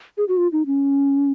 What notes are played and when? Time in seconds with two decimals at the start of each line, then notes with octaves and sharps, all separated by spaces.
0.17 G#4
0.28 F#4
0.37 F4
0.52 D#4
0.66 C#4